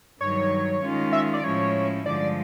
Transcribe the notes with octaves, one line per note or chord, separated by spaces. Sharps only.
G2 D#3 F#3 C#5
D#3 G#3 C#4 F4
E5
D5
A2 F3 G#3 C#4 E4 C#5
G2 D3 F3 G#3 D5